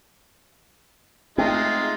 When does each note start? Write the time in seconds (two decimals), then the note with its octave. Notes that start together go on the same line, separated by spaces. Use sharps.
1.38 G#3 A3 C4 D#4 F4